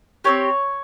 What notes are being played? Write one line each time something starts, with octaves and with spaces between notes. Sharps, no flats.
C4 D#4 G4 C#5